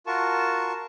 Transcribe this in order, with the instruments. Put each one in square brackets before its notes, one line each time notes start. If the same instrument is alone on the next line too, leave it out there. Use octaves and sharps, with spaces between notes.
[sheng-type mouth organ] F4 F#4 A#4 A5 C#6